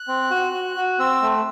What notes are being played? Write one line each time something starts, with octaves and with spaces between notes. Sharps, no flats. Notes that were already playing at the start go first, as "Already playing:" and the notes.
Already playing: F#6
C4
F#4
F#4
F#4
C4 E6
A3